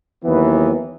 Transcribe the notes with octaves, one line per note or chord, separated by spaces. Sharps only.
D#2 E3 F#3 B3